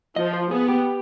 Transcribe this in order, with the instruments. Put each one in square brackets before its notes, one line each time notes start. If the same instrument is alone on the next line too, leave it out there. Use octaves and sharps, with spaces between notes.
[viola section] F3 [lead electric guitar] D#5
[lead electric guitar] C5
[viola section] B3 [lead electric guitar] G#4
[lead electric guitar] G4